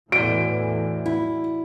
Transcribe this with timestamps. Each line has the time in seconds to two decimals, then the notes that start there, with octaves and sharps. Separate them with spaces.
0.12 E2 A2 E3 F#4 D5 D7
1.06 E4